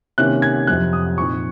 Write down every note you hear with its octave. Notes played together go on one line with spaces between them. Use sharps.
C3 D#3 A#3 C#4 F#6
G#6
F2 C3 F#3 F#6
D#6
A#2 F3 C4 D#4 C#6